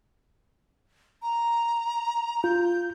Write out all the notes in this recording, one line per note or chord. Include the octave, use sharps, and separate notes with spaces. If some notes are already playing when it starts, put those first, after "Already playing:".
A#5
F4 G6